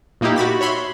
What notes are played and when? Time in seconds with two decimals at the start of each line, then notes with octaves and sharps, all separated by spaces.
0.21 A#2 A#3 D#4 E4 G4
0.36 F#4 B5 A6 B6
0.61 C#5 E5 B5 C6